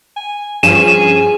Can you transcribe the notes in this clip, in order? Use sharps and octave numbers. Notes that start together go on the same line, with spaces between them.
G#5
G2 F3 C#4 G#4 D#7 E7